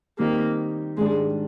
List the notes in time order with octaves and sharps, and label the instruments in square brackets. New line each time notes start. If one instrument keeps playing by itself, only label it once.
[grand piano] D#3 G3 C4 D#4 G4 [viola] A#3
[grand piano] G#2 D#3 G3 D4 [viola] G#3